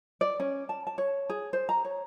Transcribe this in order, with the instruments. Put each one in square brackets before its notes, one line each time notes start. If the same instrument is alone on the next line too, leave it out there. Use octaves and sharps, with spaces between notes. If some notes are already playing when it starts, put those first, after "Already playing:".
[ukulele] D5
C#4
A5
A5
C#5
G#4
C5
A#5
C#5